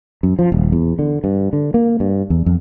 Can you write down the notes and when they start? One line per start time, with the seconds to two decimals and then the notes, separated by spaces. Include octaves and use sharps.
0.23 F#2
0.39 F3
0.52 D#1
0.72 E2
0.99 D3
1.24 G2
1.53 D3
1.74 A#3
2.00 G2
2.30 E2
2.46 F2